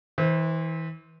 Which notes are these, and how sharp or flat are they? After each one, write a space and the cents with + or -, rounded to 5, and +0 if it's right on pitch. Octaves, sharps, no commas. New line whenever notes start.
E3 -30 C5 +0